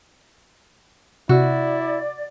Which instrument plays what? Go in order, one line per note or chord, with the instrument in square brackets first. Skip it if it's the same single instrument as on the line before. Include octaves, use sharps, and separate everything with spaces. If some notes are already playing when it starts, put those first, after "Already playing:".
[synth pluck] C3 E6 [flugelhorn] E4 [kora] F#4 [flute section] D5